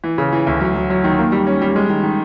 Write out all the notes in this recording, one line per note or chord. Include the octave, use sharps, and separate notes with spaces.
E3
C#3
E3
D2
F#3
F#3
F#3
D#3
A#3
G3
C#4
G3
G#3
D#3
D#3